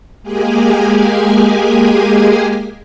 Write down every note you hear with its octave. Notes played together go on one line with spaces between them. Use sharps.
G#3 A#3 G4 G#4 G#5